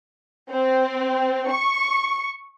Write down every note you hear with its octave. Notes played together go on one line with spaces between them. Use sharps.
C4
C#6